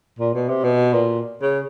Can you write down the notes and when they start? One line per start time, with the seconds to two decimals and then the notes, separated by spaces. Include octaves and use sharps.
0.19 A#2
0.35 B2
0.49 C3
0.64 B2
0.94 A#2
1.42 C#3